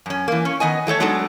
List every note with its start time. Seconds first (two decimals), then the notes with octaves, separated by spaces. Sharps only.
0.06 F#2 C#4
0.28 E3 A#3
0.45 C#4
0.60 D#3 B3 D#5 G#5
0.87 F#3 A3 A4 C#5
1.00 F#3 G#3 B3 D4 D#4 A4